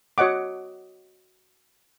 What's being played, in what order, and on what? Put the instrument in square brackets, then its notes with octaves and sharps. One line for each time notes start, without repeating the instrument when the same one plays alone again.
[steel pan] F#4 C#5 D#5 F#5 D6